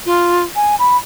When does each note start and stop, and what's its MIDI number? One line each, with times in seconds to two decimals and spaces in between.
0.05 0.43 65
0.55 0.75 80
0.79 0.97 83